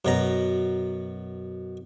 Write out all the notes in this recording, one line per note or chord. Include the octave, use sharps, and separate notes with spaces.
F#2 B2 A#5